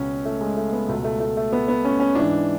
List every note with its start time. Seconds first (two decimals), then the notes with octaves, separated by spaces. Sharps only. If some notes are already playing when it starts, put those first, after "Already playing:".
Already playing: C#2 B2 C#4
0.25 A3
0.41 G#3
0.57 A3
0.73 B3
0.89 C#2 B2 A3
1.04 A3
1.20 A3
1.37 A3
1.53 B3
1.68 B3
1.85 C#4
2.00 C#4
2.15 G#2 E3 D4